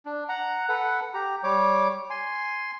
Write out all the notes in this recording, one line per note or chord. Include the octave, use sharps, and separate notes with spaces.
D4
F#5 A#5
A4 B4 F#5
G4 A#5
G3 C#5 D6
G#5 C6